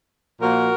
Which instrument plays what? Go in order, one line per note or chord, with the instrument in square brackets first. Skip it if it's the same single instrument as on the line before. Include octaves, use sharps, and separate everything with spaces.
[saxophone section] A#2 F3 A#3 F#4 A#4